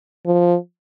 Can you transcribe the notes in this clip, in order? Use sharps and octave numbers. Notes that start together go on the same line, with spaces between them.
F3